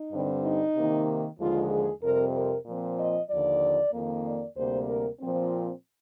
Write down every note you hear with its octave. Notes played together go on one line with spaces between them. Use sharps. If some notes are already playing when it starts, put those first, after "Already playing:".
Already playing: D#4
G2 D3 G3 C4
D#4
C3 D#3 A#3
D#2 D3 F3 G#3 F4
G#4
F2 C3 G3 C4 A#4
A#4
A#2 F3 C4
D#5
D#2 D3 F3 D5
F2 D#3 A#3
D5
D2 C3 G3 A#3 C5
A#4
A#2 F3 C4